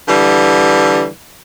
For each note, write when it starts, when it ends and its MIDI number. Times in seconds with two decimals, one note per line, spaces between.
0.08 1.07 50
0.08 1.07 52
0.08 1.07 55